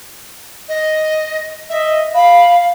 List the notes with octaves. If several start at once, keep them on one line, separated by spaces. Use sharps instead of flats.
D#5
D#5 E5
F5 B5